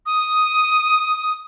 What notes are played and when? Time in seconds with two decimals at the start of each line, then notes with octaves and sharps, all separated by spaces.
0.06 D#6